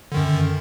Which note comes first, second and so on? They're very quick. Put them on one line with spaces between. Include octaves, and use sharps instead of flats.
D3 D#3 F#2